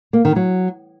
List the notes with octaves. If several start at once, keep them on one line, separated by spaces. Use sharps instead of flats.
A#3
D#3
F#3